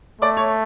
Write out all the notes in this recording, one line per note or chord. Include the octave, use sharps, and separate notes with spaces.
A3 D5 D6
C#5 C#6